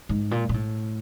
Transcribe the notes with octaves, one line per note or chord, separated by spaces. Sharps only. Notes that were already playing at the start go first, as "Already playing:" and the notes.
G#2
A#2
A#2
A2